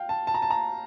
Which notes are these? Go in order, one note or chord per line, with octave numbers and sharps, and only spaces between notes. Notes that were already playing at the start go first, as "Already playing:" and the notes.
Already playing: F5 G5
A5
A5
A#5
A5
A#5